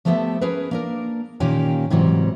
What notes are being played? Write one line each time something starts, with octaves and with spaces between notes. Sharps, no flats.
F3 A3 B3 G4 A4 E5
C#4 G#4 A#4 B4
A#3 D4 A#4
A#2 D#3 A#3 C#4 G4
G#2 C3 E3 F#3 G3